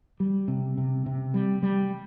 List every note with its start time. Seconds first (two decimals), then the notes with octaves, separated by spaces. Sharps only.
0.20 G3
0.48 C3
0.78 C3
1.06 C3
1.34 G3
1.63 G3